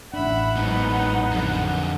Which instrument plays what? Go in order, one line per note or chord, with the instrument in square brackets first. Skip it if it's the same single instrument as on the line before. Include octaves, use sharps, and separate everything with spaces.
[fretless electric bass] A1 D4 [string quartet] E5 B5 [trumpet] F#5
[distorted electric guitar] G#2 B2 [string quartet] F#3 B3 D#4
[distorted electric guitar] F2 D3